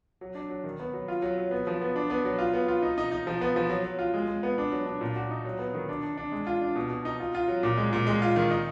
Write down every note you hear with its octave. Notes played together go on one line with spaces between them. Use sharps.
F#3
D4
F#3
D#3
B3
F#3
F4
F#3
F#3
B3
F3
B3
D4
B3
F#3
F4
B3
F4
D#4
D#4
D#4
F3
B3
F3
F#3
F#3
F4
G#3
G#3
B3
D4
F#3
D4
A#2
F#4
D#4
F#3
B3
D#3
D4
D4
D4
G#3
F4
D4
B2
B2
D#4
F4
F4
F#3
A#2
G#3
A#2
G#3
F4
D#3
D#4